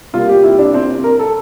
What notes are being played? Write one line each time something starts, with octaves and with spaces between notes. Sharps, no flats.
C3 G3 A#3 F4
G4
E4
D4
C4
A#4
A4